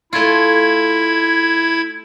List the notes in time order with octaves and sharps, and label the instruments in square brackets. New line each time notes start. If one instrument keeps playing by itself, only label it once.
[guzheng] A3 F4 [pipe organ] E4 G#6